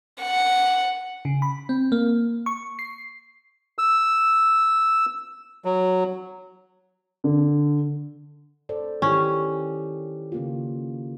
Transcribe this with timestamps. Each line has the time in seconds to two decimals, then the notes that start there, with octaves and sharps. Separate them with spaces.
0.21 F#5
1.25 C#3
1.42 B5
1.69 C4
1.92 A#3
2.46 C#6
2.79 C7
3.78 E6
5.65 F#3
7.24 D3
8.69 A4 C5 D5
9.02 D#3 C#4 E4 G4
10.32 C#3 A#3 F4